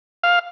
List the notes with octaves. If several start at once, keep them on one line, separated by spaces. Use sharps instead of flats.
F5